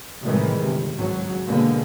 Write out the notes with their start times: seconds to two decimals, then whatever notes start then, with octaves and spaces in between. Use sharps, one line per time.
0.23 A2 C3 D#3 E3 G3 G#3
0.60 G1 C3
0.96 G#1 C#2 G#2 F#3
1.46 B2 D3 G#3 A#3 B3